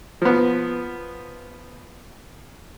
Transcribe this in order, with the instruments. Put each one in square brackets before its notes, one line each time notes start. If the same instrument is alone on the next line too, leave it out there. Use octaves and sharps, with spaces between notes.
[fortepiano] F3 B3